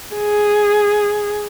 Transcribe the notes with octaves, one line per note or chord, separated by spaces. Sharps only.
G#4